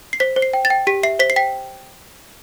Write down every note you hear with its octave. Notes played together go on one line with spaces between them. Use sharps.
C7
C5 B6
C5
C7
G5
A6
G5
G4 B6
E5 C7
C5 B6
C7
G5 B6